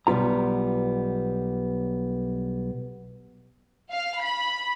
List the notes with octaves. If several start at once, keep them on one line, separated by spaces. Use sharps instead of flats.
B1 G3 B3 F4 A#5
F5
B5